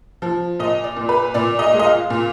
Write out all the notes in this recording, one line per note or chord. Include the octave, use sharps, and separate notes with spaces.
F3
A#2 D#5
D5
A#2
B4
A#2 D5
D#5
G#3
D#5
F5
A#2